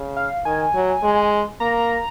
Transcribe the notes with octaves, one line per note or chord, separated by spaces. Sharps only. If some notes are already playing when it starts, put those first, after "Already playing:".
Already playing: C#3
F5
D#3 G#5
F#3
G#3
A#3 A#5